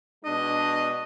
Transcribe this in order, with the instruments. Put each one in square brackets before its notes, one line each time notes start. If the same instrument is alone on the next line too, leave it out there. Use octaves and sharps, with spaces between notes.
[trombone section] B2 G#3 D4 [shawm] D#5